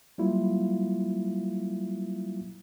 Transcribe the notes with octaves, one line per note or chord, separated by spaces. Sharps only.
F#3 G3 A#3 E4 F4